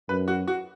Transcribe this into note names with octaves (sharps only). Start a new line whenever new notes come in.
F#2 B4
F#4
F#4